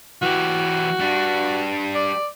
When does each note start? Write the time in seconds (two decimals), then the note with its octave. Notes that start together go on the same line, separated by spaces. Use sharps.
0.22 E3 F#4 G4
1.00 G3 D4
1.95 D5